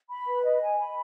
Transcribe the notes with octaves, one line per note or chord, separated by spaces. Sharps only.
B5
B4
D#5
G#5
B5